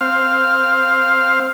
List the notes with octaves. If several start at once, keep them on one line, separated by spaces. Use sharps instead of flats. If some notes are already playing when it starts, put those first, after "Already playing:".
C4 F5